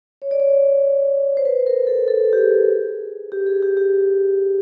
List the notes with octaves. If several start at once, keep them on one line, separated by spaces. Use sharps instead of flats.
C#5
D5
C#5
C5
B4
A#4
A4
A4
G4
G#4
G4
G#4
G4
G4